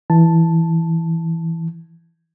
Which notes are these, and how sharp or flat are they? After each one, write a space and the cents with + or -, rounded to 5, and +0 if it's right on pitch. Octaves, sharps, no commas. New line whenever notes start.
E3 +0 A5 +0